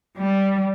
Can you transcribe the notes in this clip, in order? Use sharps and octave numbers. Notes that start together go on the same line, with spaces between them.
G3